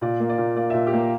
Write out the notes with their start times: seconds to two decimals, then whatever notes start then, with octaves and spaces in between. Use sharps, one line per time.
0.01 A#2 D5
0.20 A#3
0.29 D5
0.38 A#2
0.56 A#3 D5
0.70 A#2 E5
0.87 G4
0.93 A#3 A#4